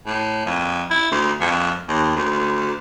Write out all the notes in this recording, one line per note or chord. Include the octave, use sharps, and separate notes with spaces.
A2
F2
E4
D2
F2
D#2
D2